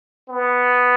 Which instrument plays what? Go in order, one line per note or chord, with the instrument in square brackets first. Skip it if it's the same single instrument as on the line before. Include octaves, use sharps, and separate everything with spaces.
[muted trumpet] B3